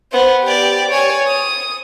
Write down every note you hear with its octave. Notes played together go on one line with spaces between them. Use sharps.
B3 C5
G4 D5
C#5 G#5
D#6